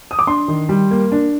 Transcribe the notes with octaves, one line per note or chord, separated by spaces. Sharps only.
D#6
D6
D4 C6
D#3
G3
A#3
D4